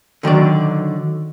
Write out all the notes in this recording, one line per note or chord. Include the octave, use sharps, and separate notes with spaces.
D3 D#3 F#3 D5